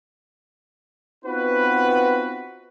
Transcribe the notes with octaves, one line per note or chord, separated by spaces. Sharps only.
B3 C4 D#4 F4 F#4 B4